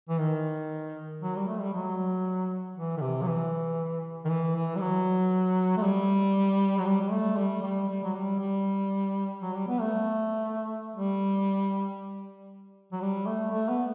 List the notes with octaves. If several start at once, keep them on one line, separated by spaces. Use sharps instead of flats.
E3
D#3
F#3
G3
A3
G3
F#3
E3
D#3
C3
F#3
E3
D#3
E3
E3
G3
F#3
A3
G3
F#3
G3
G3
A3
G3
G3
G3
F#3
G3
G3
F#3
G3
B3
A3
G3
F#3
G3
A3
A3
B3